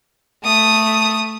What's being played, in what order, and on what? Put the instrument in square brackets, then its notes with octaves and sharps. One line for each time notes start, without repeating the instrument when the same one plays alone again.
[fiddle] A3 D#6